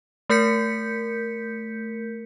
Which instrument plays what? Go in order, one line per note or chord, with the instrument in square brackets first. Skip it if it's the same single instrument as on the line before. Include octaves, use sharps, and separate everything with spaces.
[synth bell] A3 A#4 G6 B6 C#7